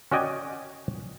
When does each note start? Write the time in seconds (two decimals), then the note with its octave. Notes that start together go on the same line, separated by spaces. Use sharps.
0.12 C#4 F#4 D5 D#5 G5 G#5